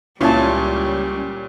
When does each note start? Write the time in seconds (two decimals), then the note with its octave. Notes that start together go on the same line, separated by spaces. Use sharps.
0.21 C#2 A#2 G3 C#4 E4 F4 A5